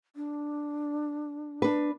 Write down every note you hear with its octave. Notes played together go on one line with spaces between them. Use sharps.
D4
D4 B4